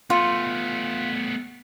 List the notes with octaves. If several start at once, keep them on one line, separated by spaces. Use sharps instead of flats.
A3 B3 F4